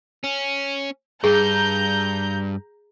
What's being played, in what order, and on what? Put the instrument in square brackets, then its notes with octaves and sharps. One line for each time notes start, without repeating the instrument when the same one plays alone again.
[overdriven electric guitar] C#4
[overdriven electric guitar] G2 [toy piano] G#4 [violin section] A#5 G6